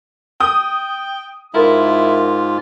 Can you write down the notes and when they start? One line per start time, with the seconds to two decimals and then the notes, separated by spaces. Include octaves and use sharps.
0.40 G5 D#6
1.54 G#2 E4 F4 A#4